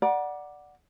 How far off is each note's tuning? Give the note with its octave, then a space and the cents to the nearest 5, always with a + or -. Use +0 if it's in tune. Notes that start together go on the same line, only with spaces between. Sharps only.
D5 +5 F#5 +0 A#5 +40